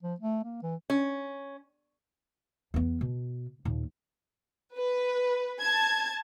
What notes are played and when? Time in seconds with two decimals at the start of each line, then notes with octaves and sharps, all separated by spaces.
0.03 F3
0.20 A3
0.44 A#3
0.62 E3
0.90 C#4
2.74 E2 B3
3.01 B2
3.65 D#2 A#2
4.75 B4
5.60 A5 G#6